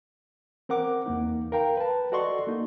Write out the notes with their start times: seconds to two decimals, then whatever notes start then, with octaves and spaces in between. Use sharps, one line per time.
0.69 C4 A#4 F#5 D6
1.06 E2 A#3 D#4
1.52 A#4 F5 G5 A#5
1.77 B4 A5
2.12 F#4 A4 D5 D#5 C6 C#6
2.47 A#3 D#4